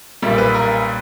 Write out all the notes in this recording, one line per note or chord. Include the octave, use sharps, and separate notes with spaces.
B1 A#2 G3 A#3
B4
A#4